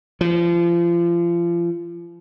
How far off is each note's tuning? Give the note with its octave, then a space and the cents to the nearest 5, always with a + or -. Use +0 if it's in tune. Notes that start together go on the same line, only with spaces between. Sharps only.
F3 -30